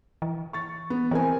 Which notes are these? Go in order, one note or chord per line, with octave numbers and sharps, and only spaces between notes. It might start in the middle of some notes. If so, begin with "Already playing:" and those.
E3
C#6 A6
B3
E3 C4 A#4 G#5